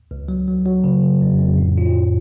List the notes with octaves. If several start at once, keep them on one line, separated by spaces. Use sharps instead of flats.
C#2
F#3
F#3
F#3
C#3
C#3
F2
F2
A2
F4
A2